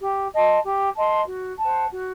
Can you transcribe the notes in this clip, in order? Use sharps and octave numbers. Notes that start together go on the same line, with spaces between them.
G4
D#5 A5 C6
G4
D#5 A5 C6
F#4
C5 F#5 A5
F#4